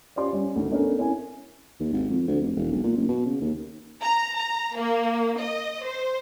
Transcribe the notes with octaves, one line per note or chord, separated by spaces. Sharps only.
C#4 F4 G4 C5 D5 C6
G3 C#4
D2 D#3
A3 B3 C#4 D4 A#4
C4 C#4 E4 A#4 G#5
D#2
G#1
F2
D2
F1
E1
B1
A#2
F#1
B2
C#3
D#2
A#5
A#5
A#3
D#5
C5